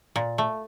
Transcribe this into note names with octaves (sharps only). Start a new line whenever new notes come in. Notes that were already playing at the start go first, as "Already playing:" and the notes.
A#2
A3